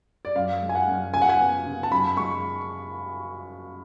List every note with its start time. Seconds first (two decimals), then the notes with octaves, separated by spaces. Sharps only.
0.25 D5
0.36 F#2 F5
0.62 G#3
0.69 G#5
0.75 F#5
0.88 F#2
1.14 C#3 G#5
1.22 F#5
1.29 G#5
1.40 B3
1.65 C#3
1.83 A5
1.91 F#2 B5
2.17 G#3 C#6